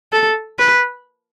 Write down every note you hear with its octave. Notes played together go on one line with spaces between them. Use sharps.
A4
B4